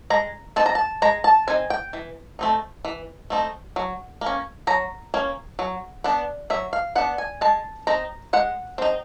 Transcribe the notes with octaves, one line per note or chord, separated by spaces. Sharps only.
G#3 A#5
C4 D#4 A5
A#5
A5
G#3 A#5
A5
C4 D#4 G#5
G5
E3
A3 C4 D#4
E3
A3 C4 D#4
F#3
A#3 C#4
F#3 A#5
A#3 C#4
F#3
B3 D4
F#3 E5
F5
B3 D4 F#5
G#5
G#3 A5
C4 D#4 A#5
G#3 F#5
C4 D#4